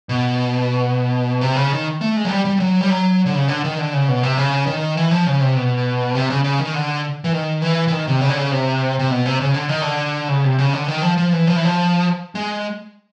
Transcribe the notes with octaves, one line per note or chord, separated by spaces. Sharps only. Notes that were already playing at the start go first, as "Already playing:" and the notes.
B2
C3
C#3
D#3
A3
G#3
F#3
G3
G3
F#3
G3
F#3
D3
C#3
D3
D#3
D3
C#3
B2
C3
C#3
D#3
E3
F3
C#3
C3
B2
C3
C#3
C#3
D#3
D3
E3
D#3
E3
E3
D#3
C3
C#3
D3
C#3
C3
C3
B2
C3
C#3
D3
D#3
D3
C#3
C3
C#3
D3
D#3
F3
F3
E3
F3
E3
F3
G#3